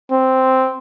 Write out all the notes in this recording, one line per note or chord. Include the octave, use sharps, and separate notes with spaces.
C4